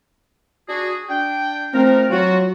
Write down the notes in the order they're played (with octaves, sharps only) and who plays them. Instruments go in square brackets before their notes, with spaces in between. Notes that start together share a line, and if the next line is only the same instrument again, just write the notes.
[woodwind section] D4 F#4 G#4
D4 G5
[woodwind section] F3 A3 A#4 [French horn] C4
[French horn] F#3 [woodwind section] F4 F#4